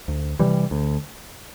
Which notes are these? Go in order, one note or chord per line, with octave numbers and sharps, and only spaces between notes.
D2
C3 E3 G3
D2